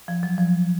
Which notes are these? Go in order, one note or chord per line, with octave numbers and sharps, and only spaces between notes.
F3
F#3
F3